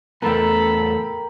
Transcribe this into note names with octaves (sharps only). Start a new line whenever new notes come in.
E2 A3 B3 A4 A#4 G5 B5